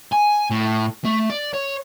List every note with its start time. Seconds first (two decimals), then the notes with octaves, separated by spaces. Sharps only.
0.13 G#5
0.51 A2
1.05 A3
1.30 D5
1.53 C#5